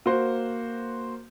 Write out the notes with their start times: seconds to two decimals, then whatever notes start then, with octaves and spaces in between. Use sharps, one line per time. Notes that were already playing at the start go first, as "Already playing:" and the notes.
0.06 A#3 F#4 C5